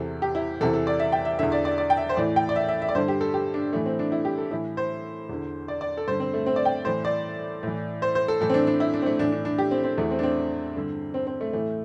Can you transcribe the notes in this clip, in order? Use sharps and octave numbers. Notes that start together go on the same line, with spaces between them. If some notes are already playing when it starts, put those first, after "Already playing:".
Already playing: E2 C3 E3 A4
G4
E4
E2 C3 E3 A4
A4
D5
E5
G5
E5
E2 D3 E5
D5
D5
D5
G5
E5
C5
A2 E3 D5
G5
D5
E5
E5
E5
D5
G2 D3 C5
G4
A4
G4
D4
A2 E3 A3
C4
D4
E4
G4
A4
A2 E3 E4
C5
E2 D3
D5
D5
A4
G2 D3 C5
C4
A3
C4
D5
G5
A2 E3 C5
D5
A2 E3
C5
C5
A4
A2 E3 A4
C4
D4
D4
E4
D4
C4
A3
A2 E3 D4
D4
D4
G4
C4
C4
E2 E3 A3
C4
D4
C4
G2 D3
C4
C4
A3
A2 E3 A3